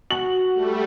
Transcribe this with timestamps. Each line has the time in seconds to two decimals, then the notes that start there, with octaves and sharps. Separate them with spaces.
0.11 F#4 F#7
0.54 G3 A3